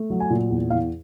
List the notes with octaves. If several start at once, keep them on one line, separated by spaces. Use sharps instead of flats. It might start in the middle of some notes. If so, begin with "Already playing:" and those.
Already playing: A3
F#3
G#5
A#2
E2
E2 F5